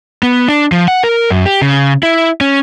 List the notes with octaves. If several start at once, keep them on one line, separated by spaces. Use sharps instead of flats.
B3
D4
F3
F#5
A#4
F#2
G4
C#3
E4
C#4